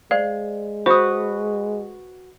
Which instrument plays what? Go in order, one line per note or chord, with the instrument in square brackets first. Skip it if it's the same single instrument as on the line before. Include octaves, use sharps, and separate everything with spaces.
[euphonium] G#3 [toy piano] C5 D5 [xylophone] F5
[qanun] F#4 B4 [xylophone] C5 [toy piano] B5 D#6